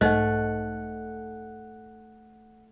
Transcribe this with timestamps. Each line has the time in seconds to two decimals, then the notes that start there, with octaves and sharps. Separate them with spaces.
0.01 B1 G#2 A3 D#4 C5 D#5 F#5 F#6